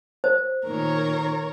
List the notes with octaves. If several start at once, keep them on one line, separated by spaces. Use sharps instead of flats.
C5
A#2 D#3 A#4 C#5